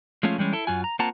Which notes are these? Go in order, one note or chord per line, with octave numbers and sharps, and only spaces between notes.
F3 G#3 A3 C#4 F4
E3 G3 G#3 C#4
E4 A4
F#2 F4 F#4 G#5
A#5
A#3 C4 F4 F#5 A5 A#5